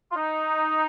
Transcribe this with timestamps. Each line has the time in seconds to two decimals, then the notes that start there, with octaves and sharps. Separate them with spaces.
0.11 F4
0.16 D#4